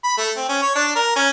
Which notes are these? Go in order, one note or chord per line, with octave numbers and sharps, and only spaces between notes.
B5
A3
C4
C#4
C#5
D4
A#4
C#4